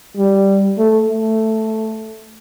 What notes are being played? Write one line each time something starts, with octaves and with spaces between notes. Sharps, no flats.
G3
A3
A3